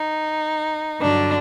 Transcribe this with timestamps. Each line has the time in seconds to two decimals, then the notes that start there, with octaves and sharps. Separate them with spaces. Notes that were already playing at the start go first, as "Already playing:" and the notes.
Already playing: D#4
1.01 G2 D3 F#3 D4